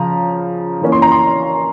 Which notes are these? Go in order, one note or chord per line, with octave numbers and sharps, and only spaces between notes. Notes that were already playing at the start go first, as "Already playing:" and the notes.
Already playing: C#3 F3 A#5
E3 A#3 C#4
C6
A#5
C6